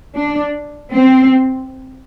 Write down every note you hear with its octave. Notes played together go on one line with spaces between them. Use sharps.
D4
C4